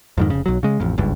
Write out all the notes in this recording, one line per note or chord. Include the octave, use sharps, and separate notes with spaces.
F2 G#2 D#3
F1 C#3
B1 F#3
C#3 G#3
A1 F2
F#1 C#2 G2